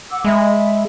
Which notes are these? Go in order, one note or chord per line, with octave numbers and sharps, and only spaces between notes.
F#5 D6 E6
G#3 E5 B5